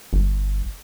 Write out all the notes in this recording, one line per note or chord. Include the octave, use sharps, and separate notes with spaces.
G1